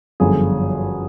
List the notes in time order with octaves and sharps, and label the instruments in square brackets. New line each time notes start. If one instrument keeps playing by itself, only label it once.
[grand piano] G1 F#2 D3 F3 G#4